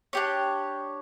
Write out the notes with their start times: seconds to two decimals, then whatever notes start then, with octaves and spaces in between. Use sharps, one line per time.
0.13 D4 G4 C#5